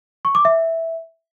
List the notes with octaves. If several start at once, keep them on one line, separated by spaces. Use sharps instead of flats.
C#6
D6
E5